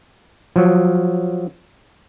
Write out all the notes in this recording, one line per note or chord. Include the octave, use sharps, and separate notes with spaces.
F3 F#3